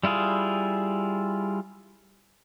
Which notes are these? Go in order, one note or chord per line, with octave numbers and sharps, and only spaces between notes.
G3 E4 F4 G#4